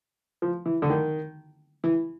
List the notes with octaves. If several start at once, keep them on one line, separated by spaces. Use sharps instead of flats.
F3
E3
D3
D#3
E3